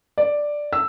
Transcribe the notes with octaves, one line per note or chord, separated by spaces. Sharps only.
D5
E6